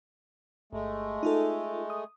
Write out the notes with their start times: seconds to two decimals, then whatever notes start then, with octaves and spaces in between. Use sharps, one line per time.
0.73 G1 G#3 A3
1.23 D#4 F4 A4
1.90 D#6